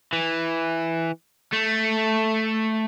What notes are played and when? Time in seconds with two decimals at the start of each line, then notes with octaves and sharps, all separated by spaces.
0.13 E3
1.53 A3